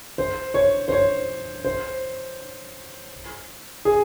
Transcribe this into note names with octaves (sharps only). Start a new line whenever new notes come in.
C5
C#5
C5
C#5
C5
G#4